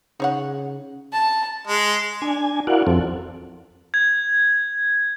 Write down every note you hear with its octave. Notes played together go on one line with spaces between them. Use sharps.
C#3 D#4 C#5 F#5
A5
G#3
D4 G#5
E4 F#4 A#4 D5 F5 F#5
F2 F3 C4 A4
G#6